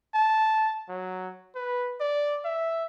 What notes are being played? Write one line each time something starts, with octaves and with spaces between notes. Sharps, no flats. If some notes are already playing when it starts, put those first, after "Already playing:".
A5
F#3
B4
D5
E5